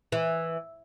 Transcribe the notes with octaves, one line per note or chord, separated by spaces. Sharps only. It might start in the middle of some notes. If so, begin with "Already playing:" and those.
E3